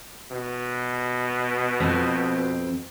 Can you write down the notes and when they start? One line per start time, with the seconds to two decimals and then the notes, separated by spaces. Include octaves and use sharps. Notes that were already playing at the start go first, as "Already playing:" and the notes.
0.31 B2
1.80 F2 C4